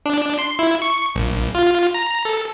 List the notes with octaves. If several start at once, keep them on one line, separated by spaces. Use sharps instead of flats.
D4
C6
E4
C#6
A#1
F4
A#5
A4